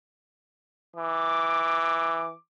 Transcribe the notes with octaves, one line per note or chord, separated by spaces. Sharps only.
E3 D6